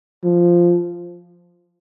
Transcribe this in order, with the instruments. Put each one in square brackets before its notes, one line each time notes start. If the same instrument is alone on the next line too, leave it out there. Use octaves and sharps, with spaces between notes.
[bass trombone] F3